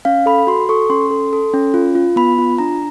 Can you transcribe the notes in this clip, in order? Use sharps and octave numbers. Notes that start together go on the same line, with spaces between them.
C#4 F5
A4 B5
F#4 C6
A4 C#6
C#4 C6
A4
A4
C#4
F4
F4
B3 B5
F4
D4 A#5